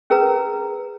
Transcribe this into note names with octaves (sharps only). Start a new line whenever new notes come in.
C#4 G#4 A#4 B4 A#5